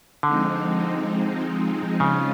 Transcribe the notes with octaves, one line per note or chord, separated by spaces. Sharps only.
D3 F3 G#3 C4 D#4
C#3 F3 G#3 C#4 F4